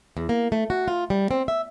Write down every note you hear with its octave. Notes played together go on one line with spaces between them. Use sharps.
E2
A#3
A3
F#4
F4
G3
C4
E5